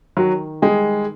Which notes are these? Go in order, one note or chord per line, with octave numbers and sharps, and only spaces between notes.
D#3 F#3 F#4
G3 G#3 G#4